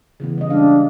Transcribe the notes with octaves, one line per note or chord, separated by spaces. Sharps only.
C#3 E3 B3
G3 D#5
G#3 C#4 D4 F5